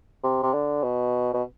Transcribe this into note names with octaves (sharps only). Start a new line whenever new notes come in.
C3
C3
D3
B2
B2